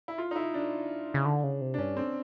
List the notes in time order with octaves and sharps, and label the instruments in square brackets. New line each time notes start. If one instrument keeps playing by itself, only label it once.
[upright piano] E4
F4
D#4
E4
D4
[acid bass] C#3
D3
C#3
C3
[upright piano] D4
[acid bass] G2 [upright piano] C#4
[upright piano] C4